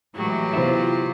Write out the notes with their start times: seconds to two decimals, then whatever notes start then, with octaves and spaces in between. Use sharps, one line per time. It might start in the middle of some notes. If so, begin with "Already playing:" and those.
0.15 A2 E3 F#3 G#3 G4
0.54 C3 B3 E4 F4 C5 E5